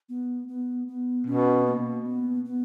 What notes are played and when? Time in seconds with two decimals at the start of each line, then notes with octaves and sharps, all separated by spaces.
0.09 B3
0.48 B3
0.88 B3
1.27 B2 C#4
1.67 A#3
2.06 B3
2.45 B3